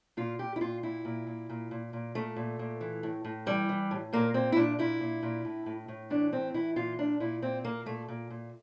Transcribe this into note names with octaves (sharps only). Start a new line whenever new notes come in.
A#2 F4
A#2 G4
E4
A#2 F4
A#2 E4
A#2
A#2
A#2
A#2
A#2
A#2 A3
A#2
A#2
E3
A2
A2
E3 G3
E3
A2
A#2 A#3
A#2 C4
E4
A#2 D4
A#2 E4
A#2
A#2
A2
A2
A2
E3 D4
A2 C4
E3 E4
A#2 F4
A#2 D4
A#2 E4
A#2 C4
A#2 A#3
A#2 A3
A#2
A#2